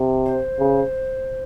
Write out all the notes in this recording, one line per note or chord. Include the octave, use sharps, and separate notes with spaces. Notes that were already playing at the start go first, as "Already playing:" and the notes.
Already playing: C3
C5
C#3